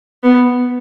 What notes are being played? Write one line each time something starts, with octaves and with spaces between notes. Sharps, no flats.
B3